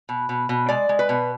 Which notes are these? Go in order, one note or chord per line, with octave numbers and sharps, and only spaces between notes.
B2
B2
B2
G#3 D5
G#3
B4
B2